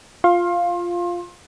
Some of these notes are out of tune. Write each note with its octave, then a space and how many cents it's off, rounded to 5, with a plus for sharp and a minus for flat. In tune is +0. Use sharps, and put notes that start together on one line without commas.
F4 +0 F5 +0 C6 +30